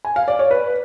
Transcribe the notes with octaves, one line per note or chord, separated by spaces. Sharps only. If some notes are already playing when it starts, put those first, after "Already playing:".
G#5
F5
D5
C#5
B4